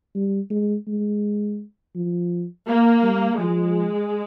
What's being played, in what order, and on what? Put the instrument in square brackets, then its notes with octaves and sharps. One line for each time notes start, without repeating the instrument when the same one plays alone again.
[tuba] G3
G#3
G#3
F3
[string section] A#3
[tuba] G3
[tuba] F3 [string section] G#3